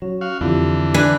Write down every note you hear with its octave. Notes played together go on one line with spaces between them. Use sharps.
F#3 C#4
F#4 F5
F2 D3 E3 E4 F4 G4
D4 B4 G#5